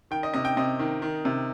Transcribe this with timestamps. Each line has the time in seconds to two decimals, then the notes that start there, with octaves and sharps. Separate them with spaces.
0.11 D#3 G5
0.23 D#5
0.34 C3 D#5
0.45 G5
0.57 C3 D#5
0.79 D#3
1.02 D#3
1.25 C3